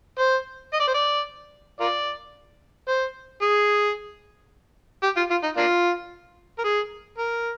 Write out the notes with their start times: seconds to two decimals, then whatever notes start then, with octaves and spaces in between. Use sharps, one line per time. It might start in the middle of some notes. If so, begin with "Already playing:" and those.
0.19 C5
0.73 D#5
0.80 D5
0.87 C5
0.94 D5
1.80 F4 A#4 D5
2.88 C5
3.42 G#4
5.03 G4
5.17 F4
5.30 F4
5.43 D#4
5.57 A#3 D4 F4
6.59 A#4
6.64 G#4
7.18 A#4